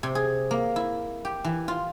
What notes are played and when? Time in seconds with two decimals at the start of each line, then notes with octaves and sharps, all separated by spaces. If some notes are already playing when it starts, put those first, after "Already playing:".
0.03 C3
0.15 G#4
0.51 A#3
0.76 E4
1.25 G4
1.44 E3
1.68 F4